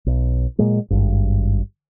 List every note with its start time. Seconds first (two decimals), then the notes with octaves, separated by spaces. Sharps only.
0.06 B1
0.59 A#2 F#3 G#3 A#3
0.90 G#1 G2